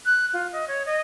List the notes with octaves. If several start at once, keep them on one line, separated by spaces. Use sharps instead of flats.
F#6
F4
D#5
C#5
D#5